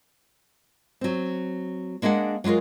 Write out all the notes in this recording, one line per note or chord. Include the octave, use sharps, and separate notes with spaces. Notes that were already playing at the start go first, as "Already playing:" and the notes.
F#3 C4
G#3 A#3 D4 G#4 F#5
F#3 G#3 F4 G#4 A#4